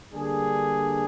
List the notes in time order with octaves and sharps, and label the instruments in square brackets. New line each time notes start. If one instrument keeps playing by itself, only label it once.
[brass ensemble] D3 G3 A#3 D4 G#4